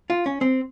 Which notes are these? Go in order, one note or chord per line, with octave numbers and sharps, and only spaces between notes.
F4
C#4
C4